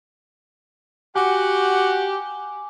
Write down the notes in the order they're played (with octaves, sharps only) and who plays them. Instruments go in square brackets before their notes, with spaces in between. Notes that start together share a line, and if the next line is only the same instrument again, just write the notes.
[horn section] F#4 F#5 [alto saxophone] G4 [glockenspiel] G#5 D6